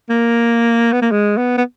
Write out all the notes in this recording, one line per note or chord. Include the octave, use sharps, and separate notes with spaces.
A#3
B3
A#3
G#3
B3
B3